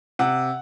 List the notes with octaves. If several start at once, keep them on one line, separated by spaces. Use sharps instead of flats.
C3 F#5